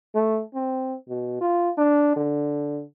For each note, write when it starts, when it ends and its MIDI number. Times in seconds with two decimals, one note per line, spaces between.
0.15 0.42 57
0.54 0.96 60
1.09 1.38 47
1.41 1.70 65
1.78 2.13 62
2.16 2.83 50